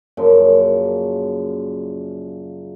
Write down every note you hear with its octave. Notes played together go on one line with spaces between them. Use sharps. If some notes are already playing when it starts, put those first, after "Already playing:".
F#2 A#2 C#3 F3